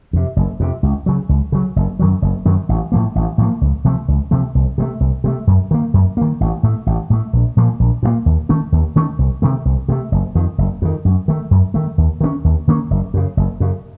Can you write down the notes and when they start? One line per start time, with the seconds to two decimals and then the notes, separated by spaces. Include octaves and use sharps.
0.13 F2 C3
0.36 F#1
0.60 F2 C3
0.83 C#2
1.06 C#3 F#3
1.29 C#2
1.52 C#3 F#3
1.76 F#1
1.99 F#2 D#3 F#3
2.22 F#1
2.45 F#2 D#3 F#3
2.69 A1
2.92 A2 F3 A#3
3.15 A1
3.38 A2 F3 A#3
3.61 C#2
3.85 C3 F3 A3
4.08 C#2
4.31 C3 F3 A3
4.55 C2
4.78 C3 F#3 A3
5.00 C2
5.24 C3 F#3 A3
5.47 F#2
5.71 D#3 A#3
5.94 F#2
6.17 D#3 A#3
6.41 A1
6.63 A2 A3
6.86 A1
7.10 A2 A3
7.33 A#1
7.57 A#2 F3 A#3
7.80 A#1
8.03 A#2 F3 A#3
8.26 D#2
8.49 D#3 A3 C#4
8.72 D#2
8.96 D#3 A3 C#4
9.19 C2
9.42 C3 D#3 A3
9.65 C2
9.88 C3 D#3 A3
10.12 F#1
10.35 F2 D#3
10.58 F#1
10.82 F2 D#3
11.05 F#2
11.28 D#3 A3
11.51 F#2
11.74 D#3 A3
11.98 D#2
12.21 D#3 A#3 C#4
12.44 D#2
12.68 D#3 A#3 C#4
12.91 F#1
13.14 F#2 C#3
13.37 F#1
13.60 F#2 C#3